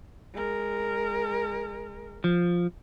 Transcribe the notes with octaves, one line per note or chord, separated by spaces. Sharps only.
G#3 A#4
F3